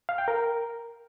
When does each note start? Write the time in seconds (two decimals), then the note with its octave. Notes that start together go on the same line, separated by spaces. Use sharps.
0.09 F5
0.18 G5
0.28 A#4